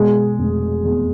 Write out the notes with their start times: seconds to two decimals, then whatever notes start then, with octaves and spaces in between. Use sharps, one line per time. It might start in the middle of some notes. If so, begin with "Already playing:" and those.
Already playing: B2 G#3 G#4
0.38 F1
0.84 E2